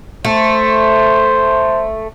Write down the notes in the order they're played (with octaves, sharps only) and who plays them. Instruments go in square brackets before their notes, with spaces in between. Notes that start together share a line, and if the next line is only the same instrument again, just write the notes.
[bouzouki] A3 [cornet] C5